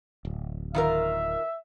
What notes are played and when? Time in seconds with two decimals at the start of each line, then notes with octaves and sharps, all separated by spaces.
0.25 D1
0.75 D#3 F4 A#4 E5